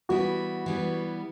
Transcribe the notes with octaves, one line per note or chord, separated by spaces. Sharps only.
E3 G3 B3 E4 F#4
E3 G3 B3 E4